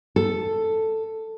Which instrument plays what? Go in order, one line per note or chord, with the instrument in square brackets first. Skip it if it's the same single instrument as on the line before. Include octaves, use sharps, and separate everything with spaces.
[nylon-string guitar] A4